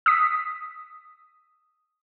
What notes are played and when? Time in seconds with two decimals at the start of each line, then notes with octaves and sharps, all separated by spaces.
0.06 D#6 E6 B6